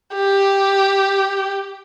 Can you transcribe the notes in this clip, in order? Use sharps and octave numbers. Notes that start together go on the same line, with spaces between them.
G4